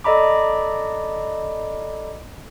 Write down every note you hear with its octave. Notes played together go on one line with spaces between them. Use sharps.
A4 D5 D#5 A#5 B5 D6